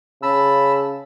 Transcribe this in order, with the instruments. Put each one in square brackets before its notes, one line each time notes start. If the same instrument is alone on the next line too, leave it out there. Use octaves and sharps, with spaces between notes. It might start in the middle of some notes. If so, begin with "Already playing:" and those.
[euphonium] C#3 [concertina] A5 B5 E6